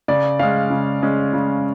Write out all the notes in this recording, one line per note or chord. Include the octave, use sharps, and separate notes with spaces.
C#3 D5
G#3 C#4 F5
C#3
G#3 C#4
C#3